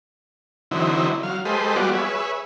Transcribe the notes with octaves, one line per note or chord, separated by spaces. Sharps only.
D3 E3 F#3 C4 D#4 E4
F#3 F5
G#3 G4 A4 B4 C5 D#5
F#3 G3 B3 F4 F#4 D5
G#4 B4 C#5 E5